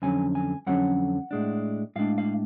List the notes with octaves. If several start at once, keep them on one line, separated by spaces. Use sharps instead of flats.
F2 D3 F#3 C#4 G#5
G#5
F2 D3 F#3 C#4 F#5
A2 G#3 D4
A2 G#3 D4 F5
F5